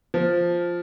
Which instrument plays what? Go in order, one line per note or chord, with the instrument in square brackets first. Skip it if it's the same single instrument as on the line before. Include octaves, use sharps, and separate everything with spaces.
[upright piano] F3